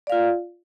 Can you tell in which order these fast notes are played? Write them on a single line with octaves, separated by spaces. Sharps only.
D5 F5 F4